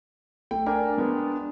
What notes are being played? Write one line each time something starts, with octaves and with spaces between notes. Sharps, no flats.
A3 G5
D4 A#4 G5 G#5
G#3 B3